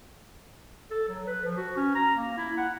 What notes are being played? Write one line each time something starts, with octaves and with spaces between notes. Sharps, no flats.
A4
F#3
B4
F3
F#4
C#4
A#5
A#3
E4
F#5